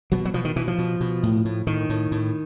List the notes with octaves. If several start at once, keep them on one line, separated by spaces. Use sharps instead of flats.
B2 F#3
F#3
B2 F3
D#3
B2 E3
F3
B2
B2
A2
A2
A2 D#3
A2
A2